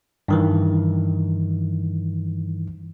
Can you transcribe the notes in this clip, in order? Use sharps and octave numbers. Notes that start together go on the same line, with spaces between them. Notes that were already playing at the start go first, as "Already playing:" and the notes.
G2 D#3 E3